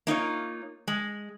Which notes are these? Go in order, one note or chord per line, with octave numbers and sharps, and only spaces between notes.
A#3 D#4 F4 C#5
G#3